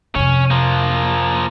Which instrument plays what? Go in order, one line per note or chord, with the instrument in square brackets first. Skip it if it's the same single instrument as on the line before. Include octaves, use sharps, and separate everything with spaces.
[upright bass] F2 C3 [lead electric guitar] C#4
[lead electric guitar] F3 A#3